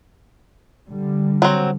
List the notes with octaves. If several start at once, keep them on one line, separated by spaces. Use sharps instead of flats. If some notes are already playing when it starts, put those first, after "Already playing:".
D3 G3
F#3 C4